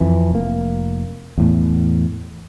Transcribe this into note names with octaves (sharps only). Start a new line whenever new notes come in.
F2 E3
F1 A#3
E2 A2